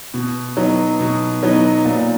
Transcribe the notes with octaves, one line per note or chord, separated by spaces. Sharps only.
B2
F#3 B3 D#4
B2
F#3 B3 D#4
A#2